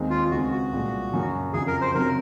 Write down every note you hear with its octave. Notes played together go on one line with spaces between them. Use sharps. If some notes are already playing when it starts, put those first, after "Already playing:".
Already playing: D#2 D#3 G#3 C4 D#4
F4
C#2 C#3 G#3 C4 F#4
F#4
C2 A#2 G#3
F#2 C#3 F#3 A#3
F2 C#3 F#3 C#4 G#4
A#4
C5
C3 F#3 C4 A#4